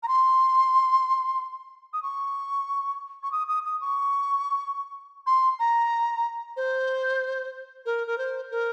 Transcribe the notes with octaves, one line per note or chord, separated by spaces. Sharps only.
A#5
C6
D#6
C#6
C#6
D#6
D#6
D#6
C#6
C6
A#5
C5
A#4
A#4
C5
A#4